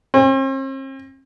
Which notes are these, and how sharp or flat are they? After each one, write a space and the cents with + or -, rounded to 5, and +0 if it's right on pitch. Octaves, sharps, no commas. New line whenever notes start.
C4 +45